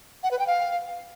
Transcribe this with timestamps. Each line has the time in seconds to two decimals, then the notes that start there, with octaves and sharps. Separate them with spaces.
0.23 F#5
0.31 B4
0.39 G5
0.47 F5